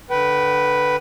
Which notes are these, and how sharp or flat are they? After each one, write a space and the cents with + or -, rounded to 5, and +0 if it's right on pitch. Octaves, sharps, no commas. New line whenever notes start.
D3 +0 B4 +0 G5 -40